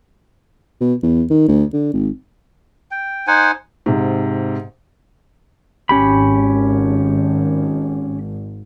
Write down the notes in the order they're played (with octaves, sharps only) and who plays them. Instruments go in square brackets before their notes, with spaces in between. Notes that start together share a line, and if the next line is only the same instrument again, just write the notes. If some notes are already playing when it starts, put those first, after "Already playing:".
[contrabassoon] B2
E2
D#3
D2
D3
G#1
[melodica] G5
D#4 C5 F#5 G#5
[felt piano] G#2 C3
[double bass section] G#1 [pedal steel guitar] C#4 G4 B5